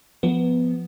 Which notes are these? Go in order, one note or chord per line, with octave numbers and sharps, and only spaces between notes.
F3 B3